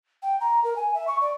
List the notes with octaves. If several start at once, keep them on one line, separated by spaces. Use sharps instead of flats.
G5
A#5
A#4
G#5
E5
C#6
D5